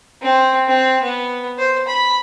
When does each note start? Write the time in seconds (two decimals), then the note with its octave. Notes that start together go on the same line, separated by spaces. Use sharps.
0.22 C4
0.67 C4
1.02 B3
1.58 C5
1.88 B5